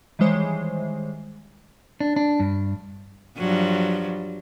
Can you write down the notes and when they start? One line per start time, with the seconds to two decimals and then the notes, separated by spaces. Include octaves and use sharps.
0.19 D#3 E3 G3 G#3 C5 C#5
2.00 D4
2.16 D4
2.40 G2
3.38 G2 F3 F#3